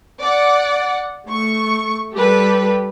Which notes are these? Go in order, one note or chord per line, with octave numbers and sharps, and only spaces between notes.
D5 F#5
A3 C#6
G3 G4 A4 B4